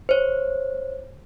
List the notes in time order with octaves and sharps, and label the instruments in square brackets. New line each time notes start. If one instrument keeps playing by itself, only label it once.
[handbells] C5 C#5